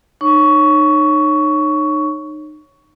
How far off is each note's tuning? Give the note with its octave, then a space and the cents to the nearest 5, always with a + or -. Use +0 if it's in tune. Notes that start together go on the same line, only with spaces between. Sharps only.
D#4 -30 C#5 -10 C#6 +15